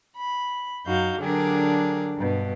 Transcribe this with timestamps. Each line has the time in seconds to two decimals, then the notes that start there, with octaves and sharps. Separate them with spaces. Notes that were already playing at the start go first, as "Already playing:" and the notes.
0.15 B5
0.85 F#2 D#4 F#4 F5 G6
1.19 D3 F#3 D4 G4 G#4 A#4
2.16 G2 B2